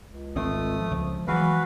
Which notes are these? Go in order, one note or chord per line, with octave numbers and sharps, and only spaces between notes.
C#2
G#1 A3 C4 D#6
F3
C#2 F3
E3 F#3 G#3 F#4 B4 F5